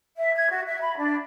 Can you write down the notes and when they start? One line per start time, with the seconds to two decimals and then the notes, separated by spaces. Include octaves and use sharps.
0.17 E5
0.35 G#6
0.51 F#4
0.66 E5
0.81 B5
0.96 D4